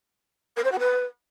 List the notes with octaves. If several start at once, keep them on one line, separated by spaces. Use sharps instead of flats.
A#4
C5
F#4
B4